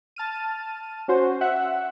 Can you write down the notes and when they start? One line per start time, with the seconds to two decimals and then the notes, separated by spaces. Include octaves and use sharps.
0.16 A5 F6 D#7
1.08 C#4 F#4 C5
1.41 E5 F#5